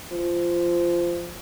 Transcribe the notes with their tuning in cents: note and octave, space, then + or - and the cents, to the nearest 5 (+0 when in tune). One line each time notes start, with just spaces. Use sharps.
F3 -15